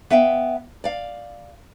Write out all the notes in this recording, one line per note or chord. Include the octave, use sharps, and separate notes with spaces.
B3 E5 F5 G5
D5 F5